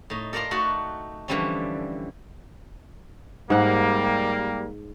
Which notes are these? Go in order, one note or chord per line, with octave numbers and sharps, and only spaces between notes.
A2 D#4
A4 A#4 D5 F5 A#5 C6
A3 D#4 F#4 A4 F#5
D3 E3 F3 G3 C4 C#4
G#2 G3 A#3 F#5